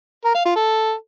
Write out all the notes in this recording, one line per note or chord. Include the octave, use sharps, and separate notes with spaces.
A#4
F5
F4
A4